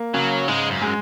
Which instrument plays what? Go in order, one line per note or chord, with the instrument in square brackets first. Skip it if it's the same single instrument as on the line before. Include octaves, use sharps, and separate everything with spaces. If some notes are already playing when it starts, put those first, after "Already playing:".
Already playing: [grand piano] A#3
[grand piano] C#3 [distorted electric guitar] F#3
[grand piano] G#2 [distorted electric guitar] G#3
[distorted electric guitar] F#2
[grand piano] G#3